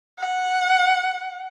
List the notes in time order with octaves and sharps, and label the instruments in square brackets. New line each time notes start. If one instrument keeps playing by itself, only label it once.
[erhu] F#5